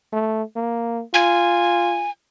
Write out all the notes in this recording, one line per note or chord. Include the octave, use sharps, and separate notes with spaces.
A3
A#3
F4 G#5